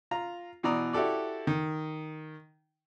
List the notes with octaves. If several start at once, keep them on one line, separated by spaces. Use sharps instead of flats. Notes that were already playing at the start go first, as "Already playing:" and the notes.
F4 A#5
B2 E3 D5 A#5 D#6
E4 F#4 G4 A4 D5
D#3